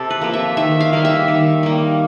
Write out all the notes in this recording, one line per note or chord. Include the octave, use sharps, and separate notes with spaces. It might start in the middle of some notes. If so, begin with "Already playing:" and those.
Already playing: C3 G4 A4
B4
F3 A#3
E5
D#3 E5
F5
G3 A#3
E5
D#3
G3 A#3